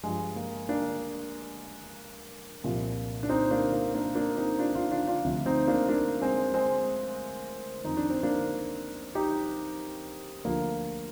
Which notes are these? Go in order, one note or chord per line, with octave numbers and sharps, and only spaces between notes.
G2 F3 G#3
A#3
A#3 D4
C2 A#2 F3
D4
C4 D#4
A#3 D4
A#3
A#3 D4
A#3 D4
C4 D#4
D4 F4
D4 F4
D4 F4
D4 F4
D2 C3 F3
C4 D#4
A#3 D4
A#3 D4
G#3 C4
G#3 C4
F2 D#3 D#4
D4
C4
A#3 D4
D#4 G4
D2 D3 F3 A#3